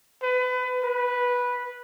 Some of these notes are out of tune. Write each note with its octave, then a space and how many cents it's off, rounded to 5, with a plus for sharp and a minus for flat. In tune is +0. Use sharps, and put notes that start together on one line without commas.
B4 +30
B4 -10